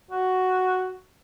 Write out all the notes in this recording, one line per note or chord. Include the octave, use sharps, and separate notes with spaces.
F#4